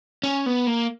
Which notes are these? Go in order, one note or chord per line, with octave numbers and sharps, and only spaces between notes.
C#4
B3
A#3